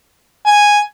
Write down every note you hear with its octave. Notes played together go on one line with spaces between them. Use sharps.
G#5